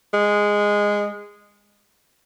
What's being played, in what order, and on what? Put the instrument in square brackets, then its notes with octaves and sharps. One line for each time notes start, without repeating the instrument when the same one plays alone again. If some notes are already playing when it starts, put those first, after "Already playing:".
[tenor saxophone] G#3